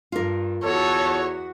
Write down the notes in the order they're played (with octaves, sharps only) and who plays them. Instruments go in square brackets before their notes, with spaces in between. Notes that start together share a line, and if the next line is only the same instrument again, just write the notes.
[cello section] G2 [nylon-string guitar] F4 A#4
[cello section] E2 F#4 [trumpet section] A4 [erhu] C#5